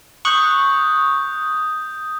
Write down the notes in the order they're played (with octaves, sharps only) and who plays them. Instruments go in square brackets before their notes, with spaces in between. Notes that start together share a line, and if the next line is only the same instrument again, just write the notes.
[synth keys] C#6 F#6 [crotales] D#6 G6